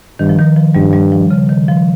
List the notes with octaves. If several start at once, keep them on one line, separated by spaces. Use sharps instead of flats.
G2 D#3
F3
D#3
F3
G2 G3
G3
F3
C#3
D#3
F3